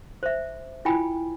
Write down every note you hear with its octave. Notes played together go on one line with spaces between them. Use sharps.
C5 E5
E4 F4 G5 G#5 B5